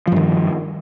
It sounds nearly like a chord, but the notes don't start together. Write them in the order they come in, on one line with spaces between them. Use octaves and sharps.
F3 G2 D#3